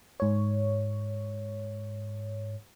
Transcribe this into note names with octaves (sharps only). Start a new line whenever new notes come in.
G#2 C#5